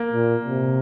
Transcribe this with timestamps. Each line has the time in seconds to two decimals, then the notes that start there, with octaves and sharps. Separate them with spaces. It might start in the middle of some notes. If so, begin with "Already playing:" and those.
Already playing: A#3
0.12 A#2
0.45 C3